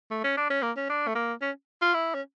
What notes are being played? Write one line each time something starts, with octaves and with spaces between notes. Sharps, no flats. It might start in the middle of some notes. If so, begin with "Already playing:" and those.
A3
C#4
D4
C#4
A#3
C#4
D4
A3
A#3
C#4
F4
E4
C#4